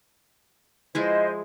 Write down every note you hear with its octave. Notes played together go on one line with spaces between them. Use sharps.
F3 G#3 E4 C5 D#5